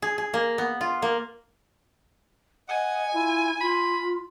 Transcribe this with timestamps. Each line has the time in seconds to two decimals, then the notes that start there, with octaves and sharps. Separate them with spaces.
0.02 G#4
0.18 G#4
0.34 A#3
0.58 B3
0.81 F4
1.02 A#3
2.69 D#5 F#5 G#5
3.14 E4 F4
3.61 F4 B5